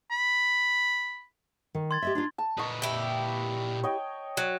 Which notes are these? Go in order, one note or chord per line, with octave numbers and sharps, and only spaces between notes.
B5
D#3
C6 G#6 A6
G4 D#5 E5
D4 D#4 F4
A5
A#2 B4 D#5 C#6
E4 G4
C#5 D#5 G5
F#3